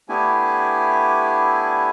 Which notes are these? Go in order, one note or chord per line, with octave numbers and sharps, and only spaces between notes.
A3 B3 D4 E4 G4 G#5